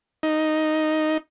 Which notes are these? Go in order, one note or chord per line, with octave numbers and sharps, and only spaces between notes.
D#4